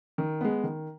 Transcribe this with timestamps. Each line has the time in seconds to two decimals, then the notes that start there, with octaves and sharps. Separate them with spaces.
0.18 D#3
0.41 G#3 B3
0.64 D#3